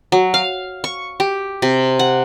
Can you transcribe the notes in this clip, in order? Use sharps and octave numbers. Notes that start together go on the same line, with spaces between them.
F#3
F5
C#6
G4
C3
F#5